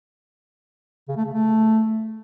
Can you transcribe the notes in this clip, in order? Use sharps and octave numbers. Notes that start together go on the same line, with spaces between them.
C#3
A3
C#3
A3